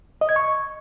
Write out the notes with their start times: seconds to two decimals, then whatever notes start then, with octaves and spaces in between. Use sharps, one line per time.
0.21 D#5
0.29 G#6
0.36 C#6